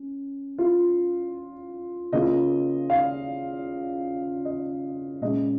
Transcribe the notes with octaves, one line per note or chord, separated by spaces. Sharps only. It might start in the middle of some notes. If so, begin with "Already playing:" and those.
Already playing: C#4
F4
C#3 A#3 F4 D#5
F5
D#5
A#2 G#3 C#4 D#5